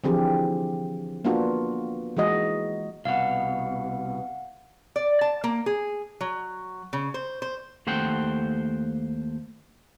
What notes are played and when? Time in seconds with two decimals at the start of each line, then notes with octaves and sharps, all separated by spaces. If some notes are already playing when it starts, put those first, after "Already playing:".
0.04 D3 E3 F3 C4 G4 G#4
1.25 A#3 B3 D4 F4 F#4
2.17 E3 G#3 F#4 D#5
3.05 C2 B2 F5 F#5
4.96 D5
5.21 A5
5.44 A#3
5.66 G#4
6.21 F#3
6.93 C#3
7.14 C5
7.42 C5
7.87 D#2 A3 C5 F#5 G5